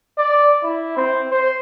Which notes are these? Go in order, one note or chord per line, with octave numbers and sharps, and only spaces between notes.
D5
E4
C4
C5